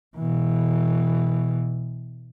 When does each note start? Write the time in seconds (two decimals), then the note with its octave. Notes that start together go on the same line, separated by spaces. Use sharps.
0.17 B2 E3